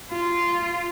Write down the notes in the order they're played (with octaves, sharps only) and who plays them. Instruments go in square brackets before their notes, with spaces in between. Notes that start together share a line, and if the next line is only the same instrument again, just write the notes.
[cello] F4